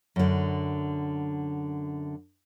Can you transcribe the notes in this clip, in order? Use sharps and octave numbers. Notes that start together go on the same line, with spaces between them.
F#2 D3